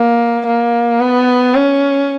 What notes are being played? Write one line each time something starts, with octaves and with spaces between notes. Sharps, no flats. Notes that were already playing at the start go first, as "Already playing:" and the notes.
Already playing: A#3
A#3
B3
C#4